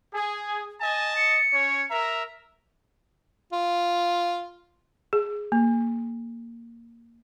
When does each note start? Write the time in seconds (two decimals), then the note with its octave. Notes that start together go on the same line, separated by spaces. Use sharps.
0.13 G#4 G#5
0.80 D#5 G#5 A5
1.17 C#7
1.51 C#4 C#5
1.90 A#4 E5 A#5
3.52 F4
5.13 G#4
5.52 A#3